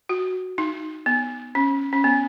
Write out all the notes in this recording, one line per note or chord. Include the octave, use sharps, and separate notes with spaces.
F#4
D#4
B3
C#4
C#4
B3